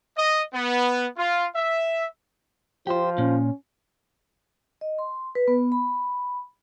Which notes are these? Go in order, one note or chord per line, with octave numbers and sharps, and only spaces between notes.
D#5
B3
F4
E5
F3 F4 G4 C5
A#2 C#4
D#5
C6
B4
B3
B5